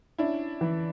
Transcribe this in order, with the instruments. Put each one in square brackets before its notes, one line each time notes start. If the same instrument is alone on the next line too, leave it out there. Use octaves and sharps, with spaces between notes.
[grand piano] C#4 [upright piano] D4 E4
[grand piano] E3